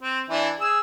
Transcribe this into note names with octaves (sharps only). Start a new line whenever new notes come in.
C4
E3 D4 E4
G#4 E6